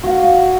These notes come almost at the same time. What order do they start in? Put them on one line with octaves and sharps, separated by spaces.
F#4 F5 F#5